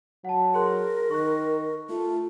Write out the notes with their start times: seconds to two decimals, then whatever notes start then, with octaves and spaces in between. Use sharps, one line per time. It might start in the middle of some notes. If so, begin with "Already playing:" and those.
0.25 F#3 F#5 A5
0.54 G#4 A#4 C6 F#6
1.10 D#3 C#6 F#6
1.89 A3 F4